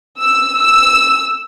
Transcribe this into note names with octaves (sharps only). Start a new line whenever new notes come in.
E6
E6